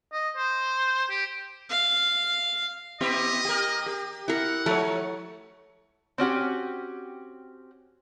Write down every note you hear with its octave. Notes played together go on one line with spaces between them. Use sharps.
D#5
C5
G4
F5
B3 E4 G4 D#5
G4 A#4
G4
E4 A#4 F#5
F3 A3 C#5
C4 C#4 F#4 G4